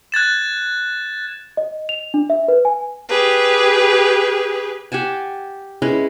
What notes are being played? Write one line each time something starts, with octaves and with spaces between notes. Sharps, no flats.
F#6 G#6 A6 E7
D#5
F7
D4
E5
B4
G#5
G4 G#4 B4
G4 F#5 G#5 A5
G#3 C#4 E4 B4